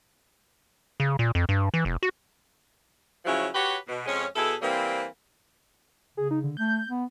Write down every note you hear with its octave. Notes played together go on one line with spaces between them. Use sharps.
C#3
A#2
F2
G2
E3
F1
F#4
C#3 F3 F#3 E4 C#5
F#4 G4 B4 C#5
B2
F2 G#3 C#4
B2 E4 G#4 A4
E3 G3 A#3 C4
C#3 G#4
D#4
D3
A3 G6
B3